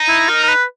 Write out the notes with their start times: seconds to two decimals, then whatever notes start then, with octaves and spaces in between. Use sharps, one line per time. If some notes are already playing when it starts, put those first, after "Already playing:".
Already playing: D#4
0.08 E4
0.29 A#4
0.43 A#4
0.48 B4